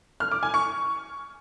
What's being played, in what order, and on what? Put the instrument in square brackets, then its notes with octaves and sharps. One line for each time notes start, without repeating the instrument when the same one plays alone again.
[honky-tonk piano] F6
D6
G#5
C#6